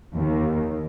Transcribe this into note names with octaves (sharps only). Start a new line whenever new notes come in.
D#2